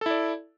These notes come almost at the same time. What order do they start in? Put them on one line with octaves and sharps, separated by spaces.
A4 E4 D5